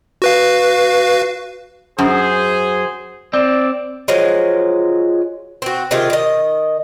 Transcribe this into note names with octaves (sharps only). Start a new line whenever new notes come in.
F#4 B4 F5
F#2 G#4 C5
C4 D5
F3 F#3 G#3
C4 F#4
C3 D#3 F4 G#4
D#3 D#5